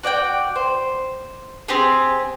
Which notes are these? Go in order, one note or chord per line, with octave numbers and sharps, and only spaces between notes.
F#4 D5 F#5 G5
C5
C4 G4 G#4